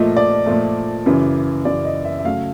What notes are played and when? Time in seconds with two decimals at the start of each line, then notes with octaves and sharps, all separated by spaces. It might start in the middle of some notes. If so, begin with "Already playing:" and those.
Already playing: A#2 F3 A3 D#5
0.17 D5
0.46 A#2 F3 A3
1.06 F#2 C#3 E3
1.65 F#2 C#3 E3 D5
1.85 D#5
2.05 E5
2.19 E5
2.25 C#3 F#3 A3 F5